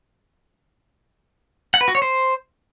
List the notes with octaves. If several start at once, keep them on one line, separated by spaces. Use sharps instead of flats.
F#5
B4
F#4
C#5
C5